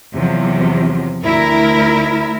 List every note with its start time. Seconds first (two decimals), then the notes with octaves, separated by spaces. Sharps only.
0.14 E2 C3 F3 F#3
1.25 D2 E4 A#4